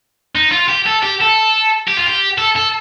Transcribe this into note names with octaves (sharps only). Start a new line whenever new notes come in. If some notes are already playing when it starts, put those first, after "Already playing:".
D#4
F4
G4
A4
G4
A4
G4
F4
G4
A4
A4